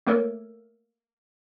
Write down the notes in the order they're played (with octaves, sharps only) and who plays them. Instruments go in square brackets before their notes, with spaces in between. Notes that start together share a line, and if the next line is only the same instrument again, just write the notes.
[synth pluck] A3 A#3 A4 A#4 C#5